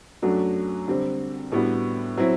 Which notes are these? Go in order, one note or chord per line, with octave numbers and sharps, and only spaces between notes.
F#2 F#3 A3 D4 F#4
D3 G3 C4 G4
A2 G3 B3 D4 F#4
F#3 C4 E4